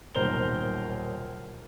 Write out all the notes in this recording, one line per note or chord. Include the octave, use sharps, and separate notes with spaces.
D#1 B1 A#4 C5 F7 G7